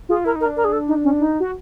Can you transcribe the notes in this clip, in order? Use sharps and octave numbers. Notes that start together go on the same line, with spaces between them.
F4 G#4
E4 A#4
D#4 A#4
D4
A#4
G#4
A4
D#4
C#4
D#4
F#4